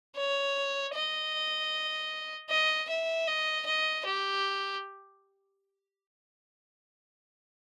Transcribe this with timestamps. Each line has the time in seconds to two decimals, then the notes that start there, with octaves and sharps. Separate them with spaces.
0.16 C#5
0.94 D#5
2.50 D#5
2.89 E5
3.27 D#5
3.66 D#5
4.05 G4